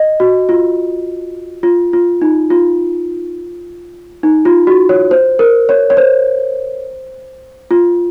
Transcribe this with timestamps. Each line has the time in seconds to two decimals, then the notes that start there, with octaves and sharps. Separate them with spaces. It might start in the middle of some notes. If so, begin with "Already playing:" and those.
Already playing: D#5
0.20 F#4
0.49 F4
1.63 F4
1.93 F4
2.22 D#4
2.50 F4
4.23 D#4
4.45 F4
4.67 F#4
4.89 C#5
5.11 C5
5.39 A#4
5.69 C#5
5.90 C#5
5.97 C5
7.71 F4